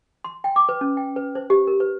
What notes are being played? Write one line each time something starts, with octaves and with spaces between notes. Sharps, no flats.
C6
G5
D6
B4
C#4
G5
B4
C5
G4
A#4
B4